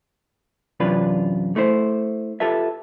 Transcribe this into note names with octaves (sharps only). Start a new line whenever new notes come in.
F#2 C3 E3 D4 F4 B4
A3 E4 C5
F4 G4 A4 B4 E5